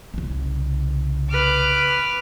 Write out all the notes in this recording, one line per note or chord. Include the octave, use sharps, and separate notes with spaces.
C2 C#3
B4 D6 F6